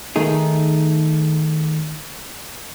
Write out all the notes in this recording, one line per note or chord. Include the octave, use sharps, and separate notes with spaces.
D#3 A3 D#4 G#4